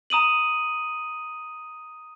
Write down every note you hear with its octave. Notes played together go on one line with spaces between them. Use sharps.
A#5 D#6 D#7 F#7